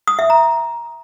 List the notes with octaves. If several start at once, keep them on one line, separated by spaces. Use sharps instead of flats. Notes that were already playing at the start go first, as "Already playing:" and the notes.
D#6
E5
A#5